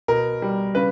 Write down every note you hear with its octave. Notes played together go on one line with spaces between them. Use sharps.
B2 A#4
G3
C#3 B4